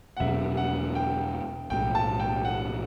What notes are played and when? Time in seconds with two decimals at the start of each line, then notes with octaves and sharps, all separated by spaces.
0.17 F#5
0.20 E2 B2 F#3 C#4 E5
0.57 F#5
0.95 G5
1.70 B1 A2 G3 G5
1.95 A5
2.20 G5
2.45 F#5